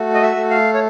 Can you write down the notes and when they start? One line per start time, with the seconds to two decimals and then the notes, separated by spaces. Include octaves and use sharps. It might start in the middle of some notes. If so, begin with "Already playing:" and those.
Already playing: A3 F#4
0.14 D#5
0.22 E5
0.36 A3
0.50 F5
0.74 C#5